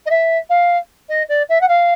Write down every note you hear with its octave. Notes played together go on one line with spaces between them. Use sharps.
D#5
E5
F5
D#5
D5
E5
F#5
F5